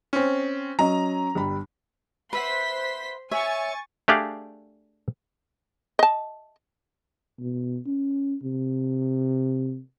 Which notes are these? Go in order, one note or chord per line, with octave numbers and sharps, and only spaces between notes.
C4 C#4
F#3 C#4 D#5 A#5
G1 G3 B5
B4 C5 E5 F#5 C6 B6
C#5 E5 G#5 C#6 A6
A3 D4 G4 G#4 D5 F5
D#5 A5
B2
C#4
C3